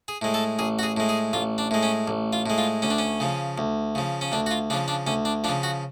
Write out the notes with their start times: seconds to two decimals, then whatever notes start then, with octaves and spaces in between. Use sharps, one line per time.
0.08 G#4
0.22 A2 G#3
0.34 A4
0.59 A1 G#4
0.79 F#4
0.83 G#4
0.97 A2 G#3
1.09 G#4
1.33 A1 F4
1.58 D4
1.71 A2 G#3
1.83 C#4
2.08 A1
2.33 F4
2.46 A2 G#3
2.58 F4
2.82 D2 C#4
2.90 D4
2.98 C#4
3.20 C#3 F3
3.58 D2
3.95 C#3 F3
4.21 C#4
4.32 D2 D4
4.46 F#4
4.51 F4
4.70 C#3 D4
4.73 F3
4.88 D4
5.07 D2 C#4
5.25 D4
5.44 F3 D4
5.49 C#3
5.63 F#4